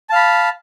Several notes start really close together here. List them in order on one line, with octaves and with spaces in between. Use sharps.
A5 F5 B5